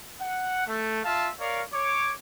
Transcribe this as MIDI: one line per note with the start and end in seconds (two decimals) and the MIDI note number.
0.21 0.64 78
0.66 1.00 57
1.04 1.29 65
1.04 1.29 76
1.04 1.29 77
1.04 1.29 81
1.39 1.61 70
1.39 1.61 73
1.39 1.61 74
1.39 1.61 77
1.73 2.12 73
1.73 2.12 86